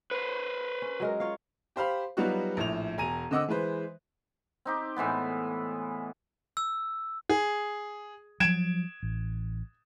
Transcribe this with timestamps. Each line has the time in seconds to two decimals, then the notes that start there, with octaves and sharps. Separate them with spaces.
0.11 B4 C5
0.82 C#4
1.00 F#3 G#3 A#4
1.20 F4 C#5 F5
1.76 G4 C5 F5 B5
2.17 F#3 G3 B3 D#4 F4 F#4
2.57 A#1 A2 F7
2.98 E1 G#5 A#5 D#7
3.31 D3 C4 D#5 F#5 D6 E6
3.48 E3 G#3 B4 C5
4.65 C4 D#4 G4
4.96 A2 E3 G#3 B3
6.57 E6
7.29 G#4
8.40 F3 F#3 G#6 D7 E7
9.03 A1